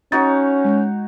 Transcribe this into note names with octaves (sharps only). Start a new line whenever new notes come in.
C#4 D#4 F#4 C#5 A6
G#3